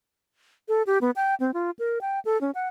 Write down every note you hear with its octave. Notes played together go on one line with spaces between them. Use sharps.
A4
G4
B3
G5
C4
F4
A#4
G5
A4
C#4
F#5